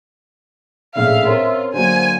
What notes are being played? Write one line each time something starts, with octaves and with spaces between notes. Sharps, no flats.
A#1 A2 C#3 E5 F5
C4 C#4 F4 A#4
D3 F#3 A#3 C5 G#5